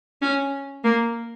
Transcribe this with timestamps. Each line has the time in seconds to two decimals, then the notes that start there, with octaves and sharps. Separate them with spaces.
0.22 C#4
0.84 A#3